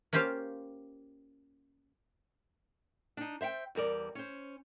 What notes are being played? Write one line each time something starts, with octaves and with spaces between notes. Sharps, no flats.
A#3 C#4 F4 G4 C5 F5
D4 D#4
C5 E5 F5 G5
E2 G3 A#4 D5
C#4 C5